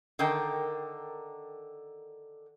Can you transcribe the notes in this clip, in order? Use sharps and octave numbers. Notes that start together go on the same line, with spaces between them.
D3 D#3 A#4 G5